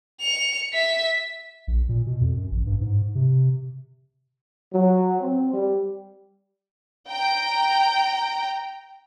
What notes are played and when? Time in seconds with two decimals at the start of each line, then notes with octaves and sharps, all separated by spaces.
0.21 C#7 F7
0.74 E5 B6
1.68 A#1
1.89 A#2
2.07 B2
2.21 F2
2.37 F#2
2.51 A1
2.66 G2
2.81 G#2
3.15 C3
4.73 F#3
5.21 C4
5.54 G3
7.11 G5 A#5